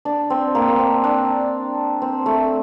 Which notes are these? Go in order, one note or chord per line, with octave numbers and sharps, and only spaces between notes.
D4
C4
A#3
A#3
C4
D4
C4
A3